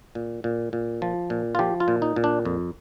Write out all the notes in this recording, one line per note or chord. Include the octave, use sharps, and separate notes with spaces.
A#2
A#2
A#2
F3
A#2
F4
F3 G4
F4
A#2
D#4
A#2
D4
F2